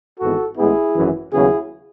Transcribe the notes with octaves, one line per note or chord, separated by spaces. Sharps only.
G#1 G#2 E3 B3 F#4 A4
A1 A2 G#3 B3 E4 G#4
G#1 F#2 E3
D#2 C#3 F#3 B3 E4 G#4